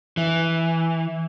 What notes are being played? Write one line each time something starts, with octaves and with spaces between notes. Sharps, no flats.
E3